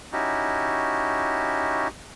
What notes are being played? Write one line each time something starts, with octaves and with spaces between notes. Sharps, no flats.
C#4 D#4 E4 F#4 G4